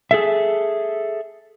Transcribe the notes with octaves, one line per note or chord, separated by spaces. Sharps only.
G#4 A4 E5